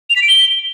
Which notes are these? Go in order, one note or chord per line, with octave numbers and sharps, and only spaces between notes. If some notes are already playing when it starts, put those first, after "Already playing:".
F7
B6
D7
G7